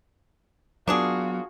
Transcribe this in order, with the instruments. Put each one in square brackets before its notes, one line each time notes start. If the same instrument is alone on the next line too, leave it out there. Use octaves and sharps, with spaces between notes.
[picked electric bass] F#3 B3 [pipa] A#3 D4 G#4 [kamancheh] F4 F#4